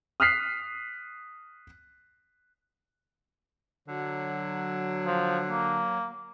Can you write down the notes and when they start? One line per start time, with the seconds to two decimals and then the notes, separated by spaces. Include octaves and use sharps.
0.20 D#6 F6 F#6 B6 C7
3.88 D3 F#3
5.06 F3
5.50 A#3